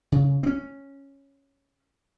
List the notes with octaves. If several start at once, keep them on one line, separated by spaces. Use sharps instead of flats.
C#3
C4 C#4